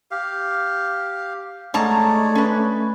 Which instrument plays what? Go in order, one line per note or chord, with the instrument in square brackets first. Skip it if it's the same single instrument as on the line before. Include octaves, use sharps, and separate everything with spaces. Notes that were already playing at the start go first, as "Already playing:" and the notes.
[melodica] G4 F5
[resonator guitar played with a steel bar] G#2 A5 A#5 [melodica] G#3 C#5 D5 [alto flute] A3
[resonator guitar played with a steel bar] C#4 B4